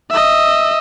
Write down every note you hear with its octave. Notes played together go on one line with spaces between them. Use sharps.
D#5 E5